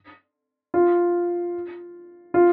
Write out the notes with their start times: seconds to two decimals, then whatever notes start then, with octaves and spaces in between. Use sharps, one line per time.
0.74 F4
2.34 F4